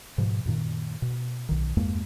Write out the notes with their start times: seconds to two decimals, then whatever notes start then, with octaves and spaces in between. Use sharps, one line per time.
0.18 G#2 B2 F3
0.45 F#2 A#2 D#3
1.02 B2
1.49 B1 D#3
1.77 E2 G2 G#3 A#3